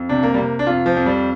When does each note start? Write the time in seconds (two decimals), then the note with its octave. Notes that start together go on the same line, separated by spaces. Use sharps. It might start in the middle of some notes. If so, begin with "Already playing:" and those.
Already playing: F2
0.09 C3 D4
0.23 A#3
0.34 G3
0.37 C3 A#3
0.59 D4
0.67 F2 F4
0.86 F3
0.97 F2
1.06 G3